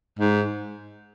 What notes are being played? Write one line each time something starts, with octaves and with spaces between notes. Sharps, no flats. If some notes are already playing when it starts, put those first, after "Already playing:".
G#2